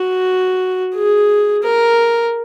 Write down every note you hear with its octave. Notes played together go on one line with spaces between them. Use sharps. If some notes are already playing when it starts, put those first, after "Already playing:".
Already playing: F#4
G#4
A#4